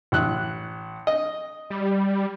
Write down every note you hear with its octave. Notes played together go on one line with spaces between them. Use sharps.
A1 F#6
D#5
G3